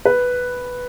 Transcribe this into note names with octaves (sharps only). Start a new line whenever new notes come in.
B4